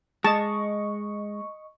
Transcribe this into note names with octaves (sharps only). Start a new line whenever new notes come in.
G#3 D#5 A5 C#6